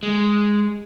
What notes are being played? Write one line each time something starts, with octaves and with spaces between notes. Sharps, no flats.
G#3